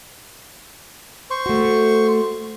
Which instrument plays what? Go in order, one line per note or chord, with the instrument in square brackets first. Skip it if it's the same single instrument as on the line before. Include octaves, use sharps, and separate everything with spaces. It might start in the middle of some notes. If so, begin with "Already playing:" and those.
[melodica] C5 C#6
[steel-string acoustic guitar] A3 F#4